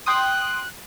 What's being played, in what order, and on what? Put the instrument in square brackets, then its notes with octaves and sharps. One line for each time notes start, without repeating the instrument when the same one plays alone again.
[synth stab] G5 C6 D#6 [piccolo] F#6